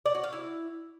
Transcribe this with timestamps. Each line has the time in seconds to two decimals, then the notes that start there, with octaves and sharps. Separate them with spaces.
0.05 D5
0.15 F#4
0.24 F5
0.33 E4